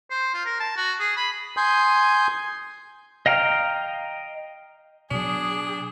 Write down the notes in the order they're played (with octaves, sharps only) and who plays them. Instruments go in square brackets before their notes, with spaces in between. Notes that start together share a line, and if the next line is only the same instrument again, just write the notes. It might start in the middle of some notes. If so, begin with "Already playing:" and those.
[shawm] C5
F4
A#4
A5
F#4
G#4
B5
[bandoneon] G#5 C6 D#6 G6
[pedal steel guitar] D#5 F5 G5 A#5 F6
[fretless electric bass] B2 F#3 [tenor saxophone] D4 [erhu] G#4 [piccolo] D#6